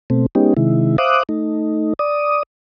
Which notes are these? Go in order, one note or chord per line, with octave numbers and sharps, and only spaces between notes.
B2 A3 C4
G#3 B3 C#4 D#4 G4
C3 D#3 G#3 E4
C5 E5 F5 D6 D#6 F#6
A3 D#4
D5 D#6